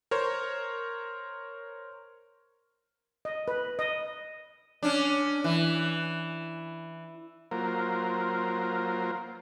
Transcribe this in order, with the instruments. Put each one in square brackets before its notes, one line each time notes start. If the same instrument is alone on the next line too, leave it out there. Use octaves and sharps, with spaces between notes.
[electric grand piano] A#4 C5 C#5
[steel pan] D#5
B4
D#5
[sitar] C#4 D4
E3
[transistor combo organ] F#3 A#3 F4 A#4 C5